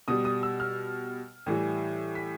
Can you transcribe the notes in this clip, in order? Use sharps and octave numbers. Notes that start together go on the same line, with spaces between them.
B2 G3 D#6
D#6
E6
F6
A2 E3 G3
B6